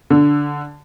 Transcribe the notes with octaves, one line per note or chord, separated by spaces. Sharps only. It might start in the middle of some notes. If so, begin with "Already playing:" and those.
D3